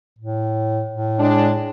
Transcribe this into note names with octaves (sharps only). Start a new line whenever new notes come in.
A2
A2
G#3 D4